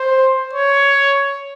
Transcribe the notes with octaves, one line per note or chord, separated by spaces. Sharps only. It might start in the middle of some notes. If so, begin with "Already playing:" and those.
Already playing: C5
C#5